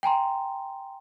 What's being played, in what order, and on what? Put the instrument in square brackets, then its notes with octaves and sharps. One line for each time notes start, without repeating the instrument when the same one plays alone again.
[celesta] G5 G#5 A#5 C6